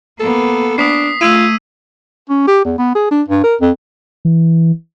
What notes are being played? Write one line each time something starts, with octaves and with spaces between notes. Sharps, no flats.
A#3 B3 A4
D4 D#6 B6 C7
A3 F4 E6 G#6 D#7
C#4
G4
E2
B3
G#4
D4
G2
A#4
F2
E3